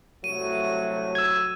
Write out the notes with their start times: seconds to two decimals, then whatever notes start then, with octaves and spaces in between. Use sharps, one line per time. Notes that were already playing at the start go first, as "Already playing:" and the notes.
0.24 C2 F#3 A3 D#7
1.15 E6 G#6